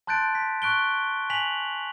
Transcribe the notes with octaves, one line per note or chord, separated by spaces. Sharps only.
A5 C6 F#6 G6 A6 D7
B6
C#6 F#6 D7 G7
G#5 B6 F7 F#7